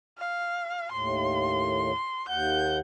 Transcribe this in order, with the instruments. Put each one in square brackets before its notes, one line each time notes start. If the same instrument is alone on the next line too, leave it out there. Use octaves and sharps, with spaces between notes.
[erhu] F5
[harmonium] D#2 A2 [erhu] C6
[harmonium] D#2 F#5 [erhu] G6